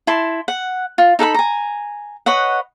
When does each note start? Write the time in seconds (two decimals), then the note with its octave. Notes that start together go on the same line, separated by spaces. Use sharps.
0.07 E4 A5 C6
0.48 F#5
0.98 F4
1.19 D#4 A4 F#5 B5
1.34 G#5 A#5
2.26 B4 C#5 D#5 F#5